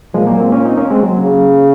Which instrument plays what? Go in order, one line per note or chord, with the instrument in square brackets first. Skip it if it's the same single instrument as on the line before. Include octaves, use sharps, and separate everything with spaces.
[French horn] A#2 [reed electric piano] F3 G#3
[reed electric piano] F#3 A#3
G#3 C4
A#3 C#4
C4 D#4
A#3 C#4
G#3 C4
F#3 A#3
[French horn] C#3